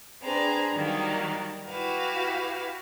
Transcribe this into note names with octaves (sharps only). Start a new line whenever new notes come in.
C4 D4 G#4 B4 A#5
D#3 F#3 G3 A#3
E4 F#4 G4 B4 F5